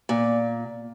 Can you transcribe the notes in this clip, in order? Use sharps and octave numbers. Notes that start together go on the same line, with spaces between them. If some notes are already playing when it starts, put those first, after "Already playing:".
A#2